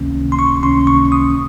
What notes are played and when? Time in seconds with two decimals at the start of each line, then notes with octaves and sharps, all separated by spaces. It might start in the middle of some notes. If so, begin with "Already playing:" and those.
Already playing: C#2 C3 D#3 A#3 C#4
0.32 C6
0.39 C#6
0.63 C#2 C3 D#3 A#3 C#4 C6
0.87 C#6
1.12 D#6